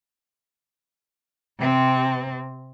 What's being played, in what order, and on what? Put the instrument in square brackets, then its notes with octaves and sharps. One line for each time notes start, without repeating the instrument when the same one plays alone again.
[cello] C3 C4